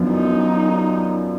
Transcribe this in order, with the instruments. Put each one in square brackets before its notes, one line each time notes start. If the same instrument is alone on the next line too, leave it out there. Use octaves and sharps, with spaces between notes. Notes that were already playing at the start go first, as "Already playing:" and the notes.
Already playing: [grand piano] F#2 F3 B3 D4
[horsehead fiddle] D#4